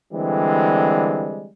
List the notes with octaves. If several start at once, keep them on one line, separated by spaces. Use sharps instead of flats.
D3 E3 G3 G#3 C4